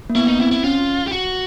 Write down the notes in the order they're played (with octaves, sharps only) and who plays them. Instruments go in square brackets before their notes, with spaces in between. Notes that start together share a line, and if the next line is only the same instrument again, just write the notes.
[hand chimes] A#3
[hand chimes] B3 [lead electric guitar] E4
[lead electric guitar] D#4
[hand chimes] C4 [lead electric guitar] E4
[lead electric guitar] E4
[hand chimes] C#4 [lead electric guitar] F4
[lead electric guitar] G4
F#4